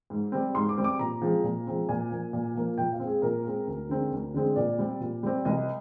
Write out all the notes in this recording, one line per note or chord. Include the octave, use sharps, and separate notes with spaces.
G#2
G3 C4
G#2 C6
D6
G3 C4
D6
A#2 A#5
F3 G#3 C4
A#2
F3 G#3 C4
A#2 G#5
F3 A#3
A#2
F3 A#3
A#2 G5
F5
G#3 C4
G#4
A#2 A#4
G#3 C4
D2
D3 G#3 C4
D2
D3 G#3 C4
A#2 D5
G3 C4
A#2
G3 C4
C2 D#5